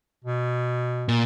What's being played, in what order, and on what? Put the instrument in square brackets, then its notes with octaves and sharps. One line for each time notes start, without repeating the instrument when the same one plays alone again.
[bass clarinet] B2
[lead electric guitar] A#2